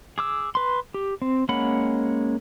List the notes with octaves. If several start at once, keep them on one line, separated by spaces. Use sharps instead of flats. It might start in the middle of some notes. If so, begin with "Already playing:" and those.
G#4 D6 E6
B4 C6
G4
C4
G#3 A#3 C#4 F#5 B5